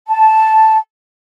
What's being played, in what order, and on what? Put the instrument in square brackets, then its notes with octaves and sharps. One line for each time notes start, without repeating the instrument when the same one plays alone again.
[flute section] A5